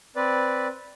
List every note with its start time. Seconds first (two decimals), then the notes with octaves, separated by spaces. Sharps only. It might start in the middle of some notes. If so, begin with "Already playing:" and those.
0.16 C4 B4 D5